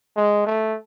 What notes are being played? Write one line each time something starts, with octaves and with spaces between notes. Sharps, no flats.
G#3
A3